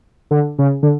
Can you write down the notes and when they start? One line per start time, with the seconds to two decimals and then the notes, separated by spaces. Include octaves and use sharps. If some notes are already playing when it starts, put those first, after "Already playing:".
0.31 D3
0.59 C#3
0.83 D3